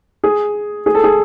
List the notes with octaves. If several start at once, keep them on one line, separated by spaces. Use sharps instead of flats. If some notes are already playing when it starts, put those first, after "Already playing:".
G#4
G#4
A4
G#4